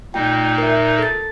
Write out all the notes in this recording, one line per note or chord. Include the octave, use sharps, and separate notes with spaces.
A#2 A3 D#4 F4 G5
A#4 E5
A4 A6